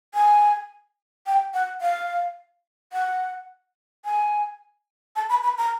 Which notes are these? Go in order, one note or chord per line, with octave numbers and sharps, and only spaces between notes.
G#5
G5
F#5
F5
F#5
G#5
A5
B5
B5
A#5